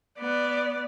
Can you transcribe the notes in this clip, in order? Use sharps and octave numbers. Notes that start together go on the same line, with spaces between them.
B3 D5